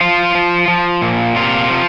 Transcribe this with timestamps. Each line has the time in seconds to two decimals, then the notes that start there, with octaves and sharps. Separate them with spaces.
0.01 F3 F4
0.35 F3
0.68 F3
1.02 A#2
1.36 C3 F4
1.70 F3